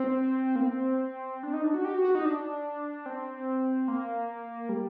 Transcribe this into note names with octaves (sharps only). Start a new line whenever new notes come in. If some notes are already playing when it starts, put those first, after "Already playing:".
Already playing: C4
A#3
C4
D4
D#4
D4
F#4
G4
F#4
F#4
D#4
D4
C4
A#3
G3